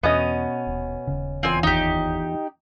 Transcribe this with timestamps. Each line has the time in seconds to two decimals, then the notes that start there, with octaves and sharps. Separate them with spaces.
0.03 E2 B2 B3 C#4 D#5
0.67 D#1
1.07 D#1 C#3
1.43 E2 C4 F4 F5 G#5
1.63 F#1 D#2 D#3 D#4 G4